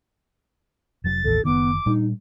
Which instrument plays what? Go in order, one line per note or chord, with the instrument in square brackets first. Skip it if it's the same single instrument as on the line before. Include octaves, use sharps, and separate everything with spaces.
[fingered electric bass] F1 F#3 [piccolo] A6
[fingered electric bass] A1 D#2 [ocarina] A4
[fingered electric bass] F#1 D#3 [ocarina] B3 [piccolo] D6
[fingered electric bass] A#2 G3 D4 [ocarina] D#4